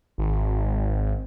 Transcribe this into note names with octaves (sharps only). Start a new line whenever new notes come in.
G#1